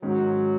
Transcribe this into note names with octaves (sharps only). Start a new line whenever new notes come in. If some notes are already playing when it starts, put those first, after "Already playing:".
G#2 D#3 F#3 G#3 C#4